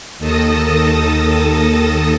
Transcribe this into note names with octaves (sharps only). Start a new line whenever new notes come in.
D#2 D#3 A4 A5 D#6 A#6